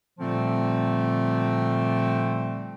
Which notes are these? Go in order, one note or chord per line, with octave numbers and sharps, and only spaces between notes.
A#2 D3 F3 G3 A3 C4